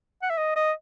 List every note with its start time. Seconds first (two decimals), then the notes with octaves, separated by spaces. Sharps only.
0.22 F#5
0.30 E5
0.37 D#5
0.56 D#5